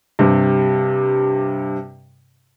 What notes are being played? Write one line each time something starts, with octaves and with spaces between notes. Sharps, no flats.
G2 C3